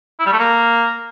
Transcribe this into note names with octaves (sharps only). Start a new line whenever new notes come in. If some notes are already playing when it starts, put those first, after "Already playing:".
E4
G3
A3
A#3